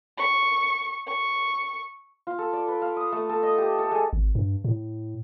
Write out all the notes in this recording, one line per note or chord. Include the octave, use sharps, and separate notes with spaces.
C#6
C#6
F4
A4
D5
B4
F5
D#6
A3
A4
D#5
G4
A4
G#3
G#1
G2
A2